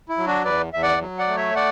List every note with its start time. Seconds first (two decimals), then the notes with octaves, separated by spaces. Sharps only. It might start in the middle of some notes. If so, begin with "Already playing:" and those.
0.09 E4
0.17 F#3
0.26 D4 F#4
0.45 E2 B4 D5
0.74 E2 E5
0.82 D5 F#5
1.01 F#3
1.19 D5 F#5
1.28 A3
1.37 C#5 E5
1.56 D5 F#5